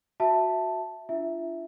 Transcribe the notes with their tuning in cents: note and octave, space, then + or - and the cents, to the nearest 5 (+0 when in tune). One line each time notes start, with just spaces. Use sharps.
F#4 -5 E5 +0 A5 +0
D4 +0 F4 -40 E5 +0